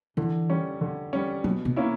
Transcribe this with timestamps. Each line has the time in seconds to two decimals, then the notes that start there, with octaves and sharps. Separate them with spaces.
0.17 D3 E3
0.49 G3 C#4
0.81 D3
1.13 G3 C#4
1.44 B2 F#3
1.65 B2
1.76 A#3 C#4 E4